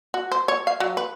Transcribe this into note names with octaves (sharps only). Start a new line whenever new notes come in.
F#4
C5
C#5
F5
F#3
B4